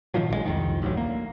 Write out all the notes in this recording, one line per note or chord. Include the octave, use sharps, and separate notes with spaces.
A#2 D#3 F3 F#3
A#1 D3 G#3
C2 F2 D#3
A1 D2 F#3
A#3